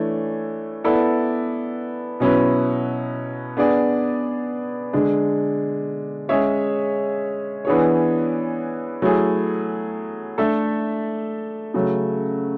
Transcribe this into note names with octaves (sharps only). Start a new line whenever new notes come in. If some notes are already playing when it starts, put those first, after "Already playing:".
Already playing: E3 A3 D4 C#5
B3 E4 A4 D5
B2 F#3 C#4 E4 B4
B3 D4 G#4 D5
D3 G#3 D4
G#3 C#4 G#4 C#5 E5
E3 B3 D4 G#4 C#5
F#3 A3 E4 G#4
A3 D4 A4 E5
C#3 F#3 A3